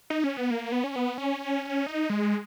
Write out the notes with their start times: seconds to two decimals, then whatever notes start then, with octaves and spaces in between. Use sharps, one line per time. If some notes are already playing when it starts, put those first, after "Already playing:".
0.10 D#4
0.24 C#4
0.37 B3
0.51 A#3
0.72 B3
0.84 C#4
0.96 B3
1.18 C#4
1.86 D#4
2.10 G#3